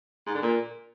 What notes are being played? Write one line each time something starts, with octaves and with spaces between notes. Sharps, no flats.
G#2
D3
A#2